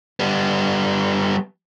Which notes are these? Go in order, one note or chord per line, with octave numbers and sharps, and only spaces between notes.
G3 B3